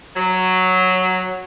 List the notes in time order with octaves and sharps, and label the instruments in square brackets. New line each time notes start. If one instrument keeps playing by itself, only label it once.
[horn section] F#3